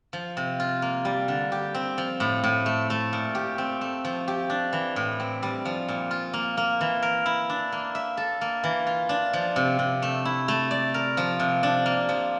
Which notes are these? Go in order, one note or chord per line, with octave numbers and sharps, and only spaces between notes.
F3
C3
F4
A#3
G3
D3
G4
C4
F3
A2
A2
A3
A3
A#2
G4
C4
A3
F3
G4
D4
E3
A2
C4
G3
F3
A#2
F4
A#3
A#3
E3
A#4
E4
D4
A#3
E5
A4
A#3
E3
F4
D4
F3
C3
C3
A3
E4
A3
D5
A#4
F3
C3
D4
A#3
F3